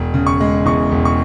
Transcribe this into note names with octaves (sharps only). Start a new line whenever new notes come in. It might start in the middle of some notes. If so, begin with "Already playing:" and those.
Already playing: E1
C#3
C#6
G#3
E2 C#6
E1
C#6